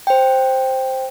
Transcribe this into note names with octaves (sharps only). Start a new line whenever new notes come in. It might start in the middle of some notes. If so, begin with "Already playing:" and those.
C5 G5